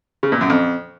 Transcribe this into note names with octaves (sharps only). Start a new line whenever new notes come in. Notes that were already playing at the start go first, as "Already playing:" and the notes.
C#3
A#2
F#2
F2